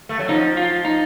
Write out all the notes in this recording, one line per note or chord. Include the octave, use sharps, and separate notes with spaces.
A3
F#3
F3 D#4
F4
D#4